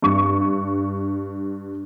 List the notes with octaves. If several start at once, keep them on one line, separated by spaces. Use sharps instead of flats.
G2 C#6